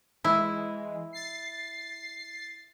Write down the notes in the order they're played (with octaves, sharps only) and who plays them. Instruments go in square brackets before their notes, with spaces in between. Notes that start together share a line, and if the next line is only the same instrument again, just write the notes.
[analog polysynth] E3 G#3 [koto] E4
[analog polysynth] A6 C7